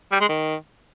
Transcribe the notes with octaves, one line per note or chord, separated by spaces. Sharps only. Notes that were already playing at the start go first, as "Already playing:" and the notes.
G3
G#3
D#3